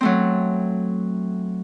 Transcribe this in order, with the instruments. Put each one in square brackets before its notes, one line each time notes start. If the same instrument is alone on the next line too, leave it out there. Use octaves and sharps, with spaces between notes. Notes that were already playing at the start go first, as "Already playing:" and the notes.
[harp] F#3 A3 C4